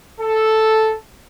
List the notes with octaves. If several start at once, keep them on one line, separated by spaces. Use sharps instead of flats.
A4